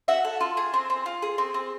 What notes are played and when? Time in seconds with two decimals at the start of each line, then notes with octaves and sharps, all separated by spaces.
0.08 F#4 E5 F#5
0.25 A4
0.41 F4
0.57 G#4
0.74 C4
0.90 C4
1.06 F4
1.22 G#4
1.38 C4
1.54 C4